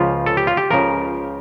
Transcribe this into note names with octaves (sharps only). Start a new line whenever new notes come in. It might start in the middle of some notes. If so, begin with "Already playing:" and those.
Already playing: C#2 C#3 F3 F4
A4
G4
F4
G4
C#2 C#3 F3 A#4